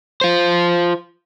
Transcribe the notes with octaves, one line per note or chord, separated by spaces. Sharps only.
F4 C5